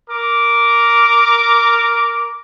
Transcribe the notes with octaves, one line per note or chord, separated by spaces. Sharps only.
A#4 D6